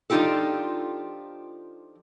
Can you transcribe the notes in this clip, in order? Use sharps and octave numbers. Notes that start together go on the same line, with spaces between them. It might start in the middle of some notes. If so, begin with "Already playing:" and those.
F3 D4 D#4 F4 G4 A4